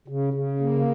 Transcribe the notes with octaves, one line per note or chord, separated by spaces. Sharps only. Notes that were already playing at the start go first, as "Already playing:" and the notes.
C#3
C#3
A#3